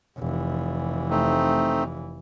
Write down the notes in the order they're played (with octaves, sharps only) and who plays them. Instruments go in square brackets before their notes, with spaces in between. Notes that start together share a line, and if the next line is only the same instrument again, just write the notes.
[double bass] F1 E3
[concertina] A3 C4 D#4